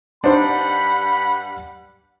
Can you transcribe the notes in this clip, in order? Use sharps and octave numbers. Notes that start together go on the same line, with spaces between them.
G2 G3 D4 D#4 C5 F#5 B5